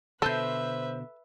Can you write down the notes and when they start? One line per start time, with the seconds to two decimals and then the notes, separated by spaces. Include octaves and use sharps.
0.22 B2 D3 A4 B4 C5 E5 F#6 G6